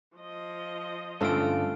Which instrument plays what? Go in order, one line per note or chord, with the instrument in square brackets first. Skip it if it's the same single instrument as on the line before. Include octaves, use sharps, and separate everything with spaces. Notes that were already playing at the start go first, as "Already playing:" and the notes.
[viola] F3 D#5
[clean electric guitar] G2 D3 [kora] A3 C4 F4 [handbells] C#4 F5 D7